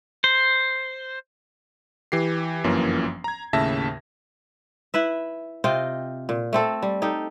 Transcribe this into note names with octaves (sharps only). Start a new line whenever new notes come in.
C5
E3 G4 C7
G1 F#2 E3 F3 A#3 C#4
A#5 G#6
D#2 A2 C#3 E5 A5 A#6
E4 B4 E5
C3 F4 D#5 G5
A#2
A3 C4 A4
G3
D#4 G4 A4